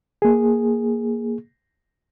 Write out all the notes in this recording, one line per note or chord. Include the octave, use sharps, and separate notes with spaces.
A#3 G#4